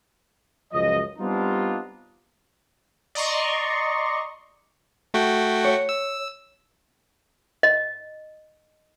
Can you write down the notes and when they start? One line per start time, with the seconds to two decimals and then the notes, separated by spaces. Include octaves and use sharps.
0.72 C#2 F#2 F3 D#5
1.18 G3 B3 C4 D4 D#4 F4
3.15 D5 D#5 A#5 C6 C#6
5.14 A3 F#4 G5
5.65 C#5
5.89 E6
7.63 D#5